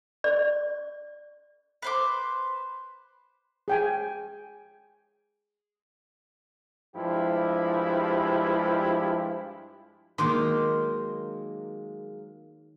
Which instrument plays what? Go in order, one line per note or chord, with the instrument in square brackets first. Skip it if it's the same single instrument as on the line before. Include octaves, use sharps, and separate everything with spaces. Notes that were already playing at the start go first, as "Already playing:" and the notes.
[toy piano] D5
[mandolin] B4 C5 D6
[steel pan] G#4 G5 G#5
[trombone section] G2 F3 G#3 E4 G4
[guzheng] D#3 [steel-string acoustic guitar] F#3 G#3 A#3 [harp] C6 D6 G6